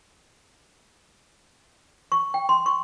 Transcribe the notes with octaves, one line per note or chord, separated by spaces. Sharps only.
C#6
G5
C6
C#6